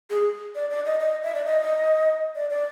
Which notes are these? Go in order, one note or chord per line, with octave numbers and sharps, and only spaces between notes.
G#4
D5
D5
D#5
D#5
E5
D5
D#5
D5
D5